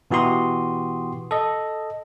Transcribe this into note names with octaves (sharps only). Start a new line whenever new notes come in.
B2 E3 F#4 G4 C6 D#6
A4 D#5